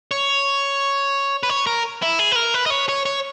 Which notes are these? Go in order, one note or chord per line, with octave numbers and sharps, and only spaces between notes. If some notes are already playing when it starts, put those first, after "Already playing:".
C#5
B4
C#5
A#4
E4
G#4
B4
A#4
B4
D#5
C#5
C#5
C#5